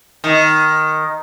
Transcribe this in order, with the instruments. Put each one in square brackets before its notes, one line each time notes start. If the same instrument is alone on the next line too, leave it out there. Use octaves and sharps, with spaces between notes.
[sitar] D#3